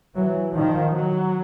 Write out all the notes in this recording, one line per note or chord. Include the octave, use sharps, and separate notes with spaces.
E3 F#3
D#3 F3
F#3